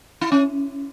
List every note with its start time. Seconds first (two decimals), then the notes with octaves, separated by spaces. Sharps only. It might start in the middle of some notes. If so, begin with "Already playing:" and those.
0.21 E4
0.32 C#4